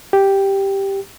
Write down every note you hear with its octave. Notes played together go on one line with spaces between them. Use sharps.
G4